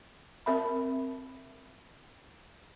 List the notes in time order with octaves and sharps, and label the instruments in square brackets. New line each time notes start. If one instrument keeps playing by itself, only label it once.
[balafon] C4 A#4 E5 B5